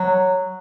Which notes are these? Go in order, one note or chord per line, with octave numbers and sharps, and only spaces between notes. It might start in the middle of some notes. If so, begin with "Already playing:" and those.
Already playing: F#3